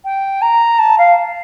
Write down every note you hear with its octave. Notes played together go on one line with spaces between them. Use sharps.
G5
A#5
A5
F5